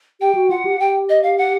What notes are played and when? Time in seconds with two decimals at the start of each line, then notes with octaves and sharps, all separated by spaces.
0.21 G4 G5
0.35 F#4
0.50 F4 F#5
0.65 G4
0.80 G4 G5
1.09 D#5
1.23 F5
1.38 F#5